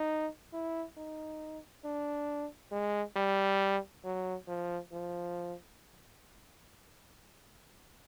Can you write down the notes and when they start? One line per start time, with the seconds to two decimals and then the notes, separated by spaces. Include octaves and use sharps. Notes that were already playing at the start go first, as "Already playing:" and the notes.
Already playing: D#4
0.53 E4
0.97 D#4
1.85 D4
2.72 G#3
3.16 G3
4.04 F#3
4.48 F3
4.92 F3